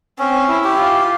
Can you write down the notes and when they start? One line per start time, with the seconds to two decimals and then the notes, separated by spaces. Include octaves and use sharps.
0.19 C4 C#4
0.48 E4
0.64 G4
0.78 F4